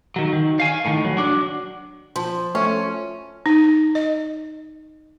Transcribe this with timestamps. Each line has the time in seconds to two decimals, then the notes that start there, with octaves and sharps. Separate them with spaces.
0.16 D#3 F#3
0.33 D#3
0.60 F5 G#5
0.85 A2 D#3
1.05 F#3
1.17 F#3 D4
2.16 F3 A5 C6
2.55 A3 C#4 F#4 E5
3.46 D#4
3.95 D#5